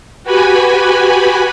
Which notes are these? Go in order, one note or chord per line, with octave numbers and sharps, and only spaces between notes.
F#4 G4 B4 G#5 B5